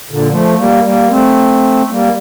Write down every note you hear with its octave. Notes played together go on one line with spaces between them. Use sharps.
A#2 D3
F3 A3
G3 A#3
G3 A#3
A3 C4
G3 A#3